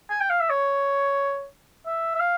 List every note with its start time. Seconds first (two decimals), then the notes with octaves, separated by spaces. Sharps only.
0.10 G#5
0.20 G5
0.30 F5
0.41 E5
0.50 C#5
1.86 E5
2.15 E5
2.21 F5